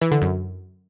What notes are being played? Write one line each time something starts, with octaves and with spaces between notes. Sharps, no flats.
E3
D3
F#2